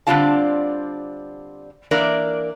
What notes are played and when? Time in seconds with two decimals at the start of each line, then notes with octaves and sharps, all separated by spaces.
0.07 D3 G3 C4 D4 F4 A5
1.91 E3 A#3 D4 A#4 D5 E5